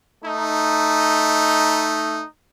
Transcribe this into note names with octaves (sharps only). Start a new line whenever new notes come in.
A3 D#4